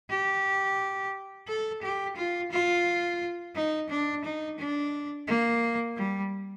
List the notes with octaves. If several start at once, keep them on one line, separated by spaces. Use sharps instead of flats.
G4
A4
G4
F4
F4
D#4
D4
D#4
D4
A#3
G3